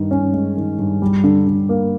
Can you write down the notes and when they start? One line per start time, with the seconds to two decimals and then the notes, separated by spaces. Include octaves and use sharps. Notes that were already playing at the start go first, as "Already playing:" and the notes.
Already playing: G2 D#3
0.11 C#4
0.34 G#3
0.57 D#3
0.79 G2
1.02 G3
1.24 D3
1.47 D3
1.69 A#3